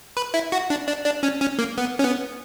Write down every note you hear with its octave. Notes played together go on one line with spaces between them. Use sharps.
B4
E4
F#4
D4
D4
D4
C#4
C#4
A#3
B3
C#4
B3